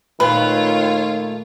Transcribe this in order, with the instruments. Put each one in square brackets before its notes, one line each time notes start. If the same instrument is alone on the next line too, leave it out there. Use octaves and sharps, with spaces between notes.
[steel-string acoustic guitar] A#2 A3 [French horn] D#3 [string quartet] F4 C#5 [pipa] B4